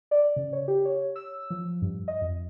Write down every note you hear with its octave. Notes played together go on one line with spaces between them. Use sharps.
D5
C#3
C#5
G4
C#5
E6
F3
G2
D#5
F2